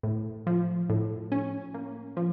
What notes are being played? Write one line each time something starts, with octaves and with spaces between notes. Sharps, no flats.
A2
F3
A2
C#4
A#3
F3